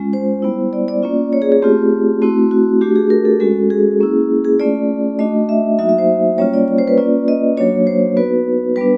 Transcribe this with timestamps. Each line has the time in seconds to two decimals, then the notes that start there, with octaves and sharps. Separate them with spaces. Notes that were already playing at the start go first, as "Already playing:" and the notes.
Already playing: G#3 C#4 F4
0.13 C5
0.42 G3 B3 E4
0.73 D5
0.88 D5
1.03 A#3 C#4 F4
1.33 C#5
1.42 G#4
1.52 G#4
1.62 A3 C4 F4 G4
2.22 A3 C4 E4 F#4
2.51 F#4
2.81 A3 D4 F#4 G4
2.95 G#4
3.10 A#4
3.25 A4
3.40 G#3 C#4 F#4 A4
3.70 G#4
4.00 A#3 C#4 E4
4.44 G#4
4.60 A3 C#4 F4 D5
5.19 A3 D4 F#4 D#5
5.49 E5
5.79 F#3 A#3 D#4 F#4 E5
5.89 E5
5.98 C5
6.38 G3 A#3 C#4 F4 C#5
6.54 D5
6.68 C#5
6.78 C5
6.88 B4
6.98 A#3 C#4 F4 D5
7.28 D#5
7.57 F#3 A#3 D4 F#4 C#5
7.87 C5
8.17 B3 D#4 F#4 B4
8.76 G3 B3 D4 B4